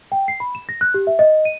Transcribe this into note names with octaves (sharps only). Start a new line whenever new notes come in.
G5
C7
B5
E7
A#6
F#6
G4
E5
D#5
D#7